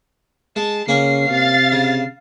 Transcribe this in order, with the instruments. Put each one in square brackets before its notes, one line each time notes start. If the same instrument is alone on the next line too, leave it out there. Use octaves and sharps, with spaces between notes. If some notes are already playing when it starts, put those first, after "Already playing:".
[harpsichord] G#3 [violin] A5
[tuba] C#3 [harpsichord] A#3 C#4 C#5 [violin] C7
[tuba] C3 [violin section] F5 A6
[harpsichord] C#3